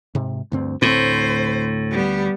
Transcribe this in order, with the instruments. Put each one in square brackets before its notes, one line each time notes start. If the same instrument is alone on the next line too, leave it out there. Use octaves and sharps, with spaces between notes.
[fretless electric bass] G#2 C3
D2 G2 C4
[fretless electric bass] D2 C4 [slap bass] A2 [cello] C5
[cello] G3 B3